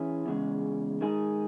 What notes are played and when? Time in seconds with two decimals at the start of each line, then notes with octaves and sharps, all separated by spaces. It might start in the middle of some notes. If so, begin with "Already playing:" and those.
Already playing: E3 C#4 E4 G#4
0.26 E2 C#3 G#3
1.01 D#3 G#3 D#4 G#4